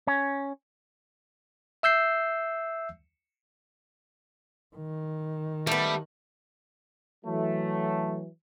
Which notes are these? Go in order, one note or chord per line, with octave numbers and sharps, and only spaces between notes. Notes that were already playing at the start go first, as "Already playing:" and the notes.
C#4
E5 E6 G6 C7
D#3
G3 A3 B3
E3 F#3 A3